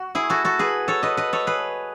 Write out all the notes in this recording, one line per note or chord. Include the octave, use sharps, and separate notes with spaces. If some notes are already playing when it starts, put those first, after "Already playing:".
Already playing: F#4
E4 G#4
F#4 A4
F#4 A4
G#4 B4
A4 C#5
B4 D#5
B4 D#5
A4 C#5
G#4 B4